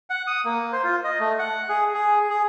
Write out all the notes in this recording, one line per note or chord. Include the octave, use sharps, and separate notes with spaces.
F#5
D#6
A#3
C5
F4
D#5
A3
F#5
G#4
G#4
G#4